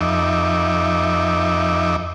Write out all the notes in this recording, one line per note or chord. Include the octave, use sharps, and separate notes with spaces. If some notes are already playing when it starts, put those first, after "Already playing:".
F2 D#4 E5 D6